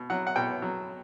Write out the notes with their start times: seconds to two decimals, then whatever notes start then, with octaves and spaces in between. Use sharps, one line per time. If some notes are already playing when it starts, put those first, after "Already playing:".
Already playing: B2
0.10 F#3 F#5
0.27 F#5
0.36 B2 G5
0.62 F#3